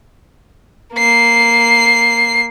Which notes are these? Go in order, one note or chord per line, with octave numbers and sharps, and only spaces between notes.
A#3 C7